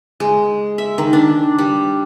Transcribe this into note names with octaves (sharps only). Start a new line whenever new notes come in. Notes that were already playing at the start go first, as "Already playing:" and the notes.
G#3
E5
D#3
D4
G3